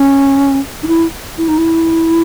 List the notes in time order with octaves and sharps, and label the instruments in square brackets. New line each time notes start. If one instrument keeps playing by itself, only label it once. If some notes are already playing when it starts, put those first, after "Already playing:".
Already playing: [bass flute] C#4
D#4
E4
E4
D#4
E4